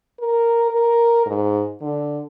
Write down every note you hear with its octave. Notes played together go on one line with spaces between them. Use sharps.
A#4
A#4
G#2
D3